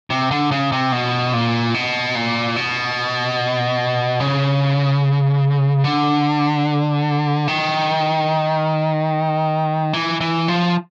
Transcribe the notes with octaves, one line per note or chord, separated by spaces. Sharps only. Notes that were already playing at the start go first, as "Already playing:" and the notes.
C3
D3
C#3
C3
B2
A#2
B2
A#2
B2
C#3
D3
D#3
E3
E3
F3